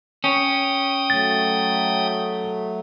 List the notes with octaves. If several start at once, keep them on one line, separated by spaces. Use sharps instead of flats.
C#4 G5 D#6
F#3 A3 A6